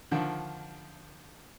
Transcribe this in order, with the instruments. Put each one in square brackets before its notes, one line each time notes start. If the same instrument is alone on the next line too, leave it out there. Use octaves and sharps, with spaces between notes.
[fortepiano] D3 D#3 F3